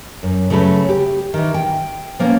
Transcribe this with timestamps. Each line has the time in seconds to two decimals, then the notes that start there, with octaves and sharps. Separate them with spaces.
0.23 F#2
0.50 C#3 F#3 A3 A4 B4
0.89 G4
1.34 D#3 E3
1.54 G5
2.19 F3 A#3 B3 C#4